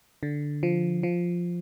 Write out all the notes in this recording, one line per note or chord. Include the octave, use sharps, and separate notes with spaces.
D3
F3
F3